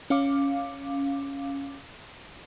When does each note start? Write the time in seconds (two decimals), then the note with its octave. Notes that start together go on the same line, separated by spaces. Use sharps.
0.10 C#4 F5 D6